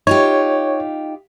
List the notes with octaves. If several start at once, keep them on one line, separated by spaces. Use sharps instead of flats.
D#4 F4 G4 C#5